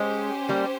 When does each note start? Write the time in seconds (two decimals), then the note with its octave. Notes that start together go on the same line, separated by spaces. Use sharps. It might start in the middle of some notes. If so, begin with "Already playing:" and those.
Already playing: G#3 C#4 G4 C5
0.49 G3 A#3